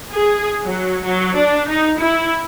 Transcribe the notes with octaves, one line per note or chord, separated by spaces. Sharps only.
G#4
F#3
F#3
D4
D#4
E4